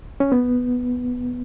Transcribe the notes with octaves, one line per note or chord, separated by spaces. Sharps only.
C#4
B3